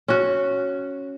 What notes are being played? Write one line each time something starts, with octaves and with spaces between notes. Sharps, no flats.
C#4 F#4